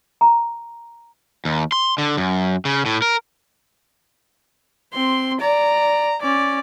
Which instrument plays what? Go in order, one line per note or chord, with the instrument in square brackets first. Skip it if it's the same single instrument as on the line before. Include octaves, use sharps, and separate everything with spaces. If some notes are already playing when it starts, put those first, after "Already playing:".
[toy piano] A#5
[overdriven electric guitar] D#2
C6
D3
F#2
C#3
A2
A#4
[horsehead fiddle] C4 [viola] C6
[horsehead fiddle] D5 [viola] A#5
[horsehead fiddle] C#4 [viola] D5